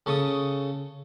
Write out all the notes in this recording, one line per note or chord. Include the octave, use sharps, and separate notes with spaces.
C#3 A4 C#6 D#6